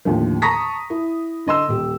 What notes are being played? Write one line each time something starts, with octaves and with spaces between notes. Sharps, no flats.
D#2 A2 D3 F3
A5 A#5 C#6 D#6 A#6 B6
E4
D3 D#5 C6 E6
D#1 G4